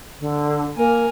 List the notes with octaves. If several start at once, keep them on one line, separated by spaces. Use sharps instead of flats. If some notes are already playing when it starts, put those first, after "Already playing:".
D3
A#3 A#4 G#5